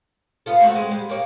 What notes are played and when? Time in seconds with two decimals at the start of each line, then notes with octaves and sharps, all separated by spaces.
0.46 B3 F4 A4
0.60 A3 C4 F#4
0.75 G#3
0.91 G3
1.09 A#3 C#5